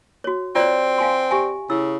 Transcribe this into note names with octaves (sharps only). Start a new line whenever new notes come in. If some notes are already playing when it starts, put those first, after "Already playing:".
F#4 C#5
C4 F4 C#5 D5
F5 G#5 C6
G4 E5 G#5
C#3 E4 E6